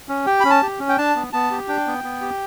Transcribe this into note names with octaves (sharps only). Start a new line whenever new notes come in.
C#4
G4 G5
C#4 B5
A5
G4
C#4
G5
D4 A5
B3
B3 A5
G4
D4 G5
B3
B3
G4